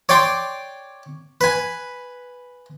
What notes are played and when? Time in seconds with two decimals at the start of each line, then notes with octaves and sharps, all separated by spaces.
0.09 C#5 D5 G5 C6 D6
1.41 B4 G#5